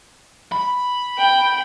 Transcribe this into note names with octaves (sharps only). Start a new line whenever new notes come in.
B5
G5